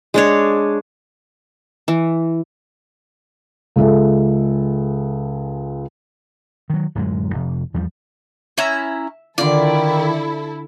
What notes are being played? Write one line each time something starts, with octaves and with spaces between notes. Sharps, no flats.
G#3 D4 C#5
E3
C#2 G#3 A4 E5
D#3 F#3
D1 F#2 G#3
F1
E2 F3 G3
C#4 E4 E5 A#5
D3 D#3 E4 F4 A4 D5